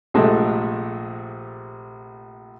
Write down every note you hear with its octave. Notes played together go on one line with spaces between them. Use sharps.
A#1 C3 G#3 A3 A4